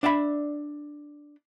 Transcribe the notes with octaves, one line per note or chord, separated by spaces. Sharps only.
D4 D5 E5 F5 B5